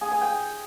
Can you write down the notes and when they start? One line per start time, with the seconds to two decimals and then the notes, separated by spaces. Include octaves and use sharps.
0.01 G#4
0.11 G#5
0.21 G5